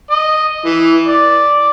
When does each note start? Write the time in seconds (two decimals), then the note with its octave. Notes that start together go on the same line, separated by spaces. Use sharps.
0.10 D#5
0.66 E3
1.07 D5